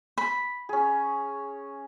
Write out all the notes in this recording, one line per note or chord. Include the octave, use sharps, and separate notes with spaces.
B5
C#4 G#4